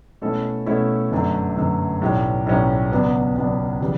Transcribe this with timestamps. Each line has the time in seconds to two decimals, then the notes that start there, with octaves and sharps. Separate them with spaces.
0.21 B2 A3 C#4 E4 A4
0.66 B2 A3 C#4 E4 A4
1.11 G1 F#2 D3 A3
1.56 G1 F#2 D3 A3
2.01 B1 A2 G3 C#4
2.46 B1 A2 G3 C#4
2.91 C#2 B2 F#3 B3 D4
3.36 C#2 B2 F#3 B3 D4
3.81 C#3 E3 G3